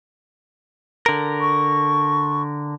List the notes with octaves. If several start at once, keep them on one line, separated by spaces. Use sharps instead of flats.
D3 A#4
C#6